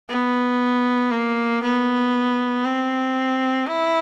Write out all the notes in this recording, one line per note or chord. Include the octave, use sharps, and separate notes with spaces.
B3
A#3
B3
C4
E4